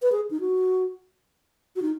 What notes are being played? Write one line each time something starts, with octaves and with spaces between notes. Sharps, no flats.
B4
G#4
D#4
F#4
F#4
D#4